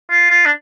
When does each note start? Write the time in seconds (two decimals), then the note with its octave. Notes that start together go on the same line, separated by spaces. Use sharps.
0.10 F4
0.30 F4
0.46 D4